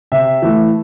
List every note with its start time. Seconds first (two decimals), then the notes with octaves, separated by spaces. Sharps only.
0.12 C3 E5
0.42 E3 A3